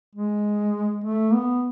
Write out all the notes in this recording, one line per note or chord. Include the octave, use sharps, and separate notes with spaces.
G#3
A3
B3